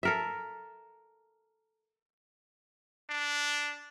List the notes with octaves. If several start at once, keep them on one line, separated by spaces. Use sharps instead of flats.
A4 A#4 E5
D4